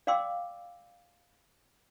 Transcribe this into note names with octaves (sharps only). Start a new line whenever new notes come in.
D5 F5 G5 C6 D6 E6